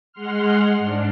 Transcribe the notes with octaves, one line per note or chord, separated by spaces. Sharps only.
G#3 F#5 C6 F6
G#2 D4